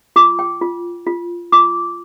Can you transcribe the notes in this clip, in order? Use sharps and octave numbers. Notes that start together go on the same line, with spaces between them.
F4 D6
G5
F4
F4
F4 D6